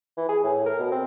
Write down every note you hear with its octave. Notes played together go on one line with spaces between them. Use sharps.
E3
G#4
A2
A#4
B2
C4